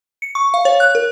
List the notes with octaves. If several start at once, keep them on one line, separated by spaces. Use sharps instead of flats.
C#7
C#6
F5
C#5
F#6
A#4